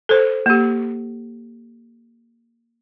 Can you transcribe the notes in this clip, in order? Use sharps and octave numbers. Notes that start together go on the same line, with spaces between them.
A4 C5
A#3 G4